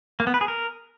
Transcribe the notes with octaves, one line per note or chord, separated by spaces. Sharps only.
A#3
B3
B4
G#4
A#4